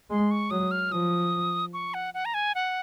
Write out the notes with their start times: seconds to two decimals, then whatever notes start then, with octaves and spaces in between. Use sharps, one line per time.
0.10 G#3 C6
0.31 C#6
0.51 F#3 D#6
0.71 F6
0.92 F3 D#6
1.74 C#6
1.94 F#5
2.14 F#5
2.25 A#5
2.34 G#5
2.55 F#5